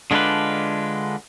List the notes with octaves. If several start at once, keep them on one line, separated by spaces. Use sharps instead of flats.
D3 G#3 D4 F4 B4